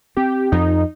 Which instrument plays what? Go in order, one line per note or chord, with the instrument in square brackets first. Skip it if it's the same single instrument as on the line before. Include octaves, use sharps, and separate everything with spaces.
[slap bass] C4 [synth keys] G4
[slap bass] F2 [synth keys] D#4